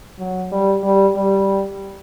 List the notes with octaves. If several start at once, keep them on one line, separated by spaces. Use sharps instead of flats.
F#3
G3
G3
G3